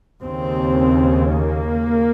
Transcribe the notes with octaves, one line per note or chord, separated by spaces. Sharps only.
D#2 C#3 C4
A#3